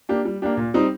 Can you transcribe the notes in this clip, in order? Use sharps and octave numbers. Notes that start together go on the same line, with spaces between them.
A#3 D4 G4
G3
A#3 D4 G4
A#2
G3 C4 D#4